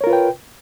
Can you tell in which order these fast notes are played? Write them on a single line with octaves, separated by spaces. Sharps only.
C#5 A#4 F4 B4 G5